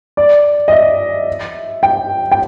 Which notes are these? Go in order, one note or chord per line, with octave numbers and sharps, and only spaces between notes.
D5
D#5
E5
G5
G5